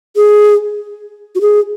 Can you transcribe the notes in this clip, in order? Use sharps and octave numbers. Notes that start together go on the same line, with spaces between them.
G#4
F#4
G#4